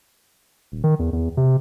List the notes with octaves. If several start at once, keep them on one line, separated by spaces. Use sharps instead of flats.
D#1
D#3
E2
E2
C3